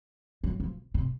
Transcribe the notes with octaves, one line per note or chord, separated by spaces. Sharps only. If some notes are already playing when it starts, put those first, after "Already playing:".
F#3
F3
C3